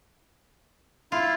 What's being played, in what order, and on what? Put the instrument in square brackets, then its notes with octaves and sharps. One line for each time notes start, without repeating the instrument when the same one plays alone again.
[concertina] E4 [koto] F4